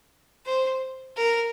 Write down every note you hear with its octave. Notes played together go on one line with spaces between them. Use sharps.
C5
A#4